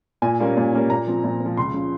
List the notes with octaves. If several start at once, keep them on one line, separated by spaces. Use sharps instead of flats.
A#2 G#5
G3 A#3 C#4
A#2
G3 A#3 C#4
A#2 A#5
F3 C4
A#2
C4
F3
C#2 C6
C#3 F3